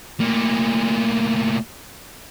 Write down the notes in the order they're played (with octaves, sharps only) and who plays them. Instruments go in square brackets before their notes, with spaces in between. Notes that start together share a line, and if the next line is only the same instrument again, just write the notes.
[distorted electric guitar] A2 A#3